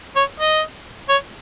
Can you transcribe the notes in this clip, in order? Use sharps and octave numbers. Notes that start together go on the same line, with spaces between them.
C#5
D#5
C#5